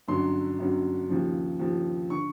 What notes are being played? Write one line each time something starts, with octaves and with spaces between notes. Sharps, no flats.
G1 F#2 D3 F#3 C6
G1 F#2 D3 F#3
D#2 C#3 F3
D#2 C#3 F3
D3 C#6